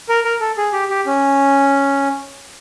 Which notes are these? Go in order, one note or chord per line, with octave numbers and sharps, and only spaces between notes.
A#4
A#4
A4
G#4
G4
G4
C#4